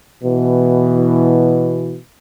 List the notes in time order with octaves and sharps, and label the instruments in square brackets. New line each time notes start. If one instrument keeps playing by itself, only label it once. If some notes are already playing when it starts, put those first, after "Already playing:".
[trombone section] B2 E3